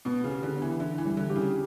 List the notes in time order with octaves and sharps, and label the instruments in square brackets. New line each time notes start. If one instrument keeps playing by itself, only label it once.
[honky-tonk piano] B2 [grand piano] B3
[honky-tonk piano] C#3
[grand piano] G4
[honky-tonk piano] D3
[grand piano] B3
[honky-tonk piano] E3
[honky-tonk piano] D3 [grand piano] E4
[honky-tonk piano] E3
[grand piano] G3
[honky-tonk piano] D3
[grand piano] G4
[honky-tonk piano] C#3